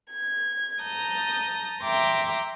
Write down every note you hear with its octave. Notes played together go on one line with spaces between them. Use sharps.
G#6
A5 A#5 D#6 G6
E5 G5 A#5 C6 D6